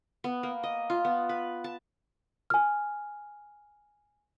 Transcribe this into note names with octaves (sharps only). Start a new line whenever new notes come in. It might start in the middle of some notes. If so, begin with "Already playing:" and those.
B3
A#3
D#5
F4
B3
B4
A5
G#5 F6